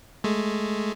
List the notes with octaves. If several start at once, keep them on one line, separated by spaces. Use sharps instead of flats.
G#3 A3